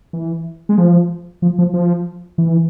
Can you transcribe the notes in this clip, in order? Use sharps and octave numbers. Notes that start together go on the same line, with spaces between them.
E3
G#3
F3
F3
F3
F3
E3